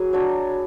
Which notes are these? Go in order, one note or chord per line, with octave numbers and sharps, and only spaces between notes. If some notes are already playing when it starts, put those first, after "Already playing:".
Already playing: F#3 G#4 B4
D4 F#4 C#5